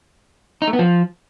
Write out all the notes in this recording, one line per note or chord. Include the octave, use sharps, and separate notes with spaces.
D#4
A3
B3
F3